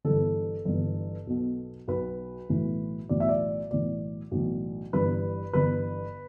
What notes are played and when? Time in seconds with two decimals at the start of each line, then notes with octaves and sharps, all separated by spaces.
0.04 G1 G2 E3 A4
0.65 G1 G2 E3
1.27 B1 B2
1.88 B1 B2 B4
2.49 B1 A2 E3
3.09 B1 A2 E3 D5
3.20 E5
3.29 D5
3.71 B1 A2 E3 D5
4.31 B1 A2 E3
4.93 G1 G2 E3 B4
5.53 G1 G2 E3 B4